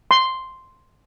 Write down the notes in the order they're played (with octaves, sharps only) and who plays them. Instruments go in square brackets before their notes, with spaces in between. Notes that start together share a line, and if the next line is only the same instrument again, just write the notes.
[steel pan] C6